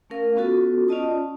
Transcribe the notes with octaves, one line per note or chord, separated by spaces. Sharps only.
A3 C#4 A#4 F5
B3 C#4 F4 F#4 A4
C#4 F4 D5 D#5 A5 D#6